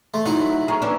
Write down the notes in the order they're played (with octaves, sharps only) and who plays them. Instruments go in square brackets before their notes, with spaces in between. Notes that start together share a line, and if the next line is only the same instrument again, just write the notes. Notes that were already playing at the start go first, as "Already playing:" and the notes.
[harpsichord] A3 [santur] C6
[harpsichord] F#3 E4 F#5 [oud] D#4
[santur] B5
[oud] G#4 [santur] A#4 C#5
[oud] E3 C#4 D4